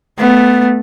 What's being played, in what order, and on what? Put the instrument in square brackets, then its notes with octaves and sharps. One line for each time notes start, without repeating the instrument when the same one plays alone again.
[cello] A3 [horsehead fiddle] B3